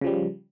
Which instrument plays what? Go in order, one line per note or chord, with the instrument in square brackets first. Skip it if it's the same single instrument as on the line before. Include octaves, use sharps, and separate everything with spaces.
[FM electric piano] C#3
F3
G3